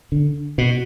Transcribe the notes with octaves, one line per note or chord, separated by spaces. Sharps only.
D3
B2